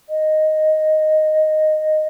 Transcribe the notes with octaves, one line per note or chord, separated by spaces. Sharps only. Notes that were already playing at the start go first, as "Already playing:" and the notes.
D#5